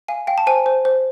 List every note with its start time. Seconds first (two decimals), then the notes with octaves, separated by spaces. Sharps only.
0.08 F5 G#5
0.27 F5 G5
0.38 A5
0.47 C5 G#5
0.66 C5
0.85 C5